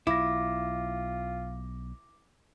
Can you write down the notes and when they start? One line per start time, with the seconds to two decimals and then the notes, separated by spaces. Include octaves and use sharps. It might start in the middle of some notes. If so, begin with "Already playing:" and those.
0.07 B1 E4 F4 D6 A#6